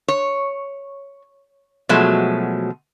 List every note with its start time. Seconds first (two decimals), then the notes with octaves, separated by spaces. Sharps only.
0.08 C#5
1.89 B2 F3 F#3 G#3 A3